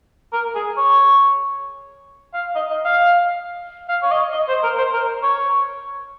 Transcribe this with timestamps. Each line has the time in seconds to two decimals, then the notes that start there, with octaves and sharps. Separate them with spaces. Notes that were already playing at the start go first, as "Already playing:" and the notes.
0.33 A#4
0.55 G#4
0.77 C#5
2.34 F5
2.55 D#5
2.70 D#5
2.85 F5
3.89 F5
4.02 C#5
4.11 D#5
4.33 D#5
4.48 C5
4.63 A#4
4.78 C5
4.93 A#4
5.23 C#5